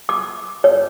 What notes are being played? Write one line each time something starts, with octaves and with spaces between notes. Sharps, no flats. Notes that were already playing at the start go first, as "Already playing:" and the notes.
D6
C#5